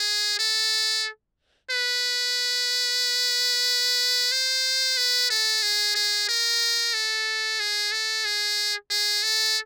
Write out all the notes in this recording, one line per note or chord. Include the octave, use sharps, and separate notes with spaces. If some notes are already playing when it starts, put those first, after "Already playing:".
Already playing: G#4
A4
B4
C5
B4
A4
G#4
G#4
A#4
A4
G#4
A4
G#4
G#4
A4